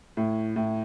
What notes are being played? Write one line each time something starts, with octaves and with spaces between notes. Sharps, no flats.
A2
A2